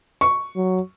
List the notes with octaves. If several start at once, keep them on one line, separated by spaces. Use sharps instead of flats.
C#6
F#3